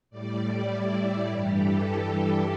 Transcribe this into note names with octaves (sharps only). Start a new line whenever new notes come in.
A2 G3 D5
D5
E4
G2 E3 G3 G4
A4